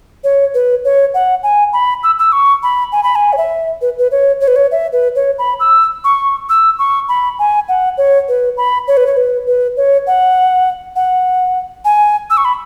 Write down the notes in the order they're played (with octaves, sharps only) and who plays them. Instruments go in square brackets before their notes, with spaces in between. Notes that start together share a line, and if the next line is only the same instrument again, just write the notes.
[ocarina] C#5
B4
C#5
F#5
G#5
B5
E6
E6
C#6
B5
G#5
B5
G#5
C#5
E5
B4
B4
C#5
C#5
B4
C#5
E5
B4
C#5
B5
E6
C#6
E6
C#6
B5
G#5
F#5
C#5
B4
B5
C#5
B4
C#5
B4
B4
C#5
F#5
F#5
G#5
E6
C#6
B5